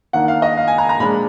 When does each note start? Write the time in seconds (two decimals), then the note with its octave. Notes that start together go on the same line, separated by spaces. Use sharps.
0.13 D#3 A#3 D4 F#5
0.28 F5
0.42 D#5
0.57 F5
0.67 G#5
0.78 A#5
0.89 A#5
1.00 A#2 F3 G#3 D4 B5